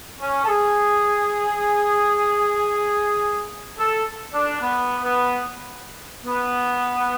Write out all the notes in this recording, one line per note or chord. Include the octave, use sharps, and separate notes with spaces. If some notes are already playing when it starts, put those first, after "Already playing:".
C#4
A4
G#4
A4
D4
B3
B3
B3